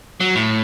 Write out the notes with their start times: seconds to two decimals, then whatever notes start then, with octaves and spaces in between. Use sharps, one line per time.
0.20 F#3
0.35 A2